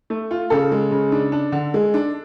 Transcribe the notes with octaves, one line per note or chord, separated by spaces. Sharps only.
A3
F4
C#3 A4
G#3
C#3
D4
D4
D3
G#3
D4